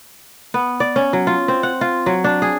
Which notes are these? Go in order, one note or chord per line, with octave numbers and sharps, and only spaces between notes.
B3
D5
C#4
F#3
F4
C4
F#5
F4
F#3
D4
G#4